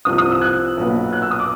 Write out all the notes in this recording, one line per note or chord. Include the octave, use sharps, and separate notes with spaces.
C2 C3 F3 D#6
D#6
E6
F#6
B1 A#2 F#3 B3
F#6
E6
D#6
D6